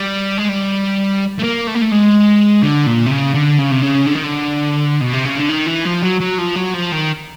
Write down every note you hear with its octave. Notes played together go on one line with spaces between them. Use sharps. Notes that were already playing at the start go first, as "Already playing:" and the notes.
Already playing: G3
G#3
G3
A3
A#3
A3
A#3
A3
G#3
D3
A#2
C3
C#3
D3
C#3
C3
C#3
D3
D#3
D3
B2
C3
C#3
D3
D#3
E3
F3
F#3
F#3
F3
F#3
F3
D#3